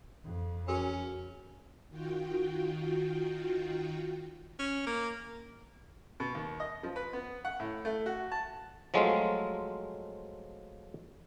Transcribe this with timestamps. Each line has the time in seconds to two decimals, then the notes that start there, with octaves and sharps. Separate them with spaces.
0.24 F2
0.68 C#4 F#4 G#4 A#4
1.89 D#3 F4 F#4 G5
4.59 C#4
4.87 A#3
6.20 B2
6.35 D#2
6.60 D#5
6.83 F3
6.96 B4
7.13 B3
7.45 F#5
7.60 A2
7.85 A3
8.06 F#4
8.32 A5
8.94 F3 F#3 G#3 A3 C4 F4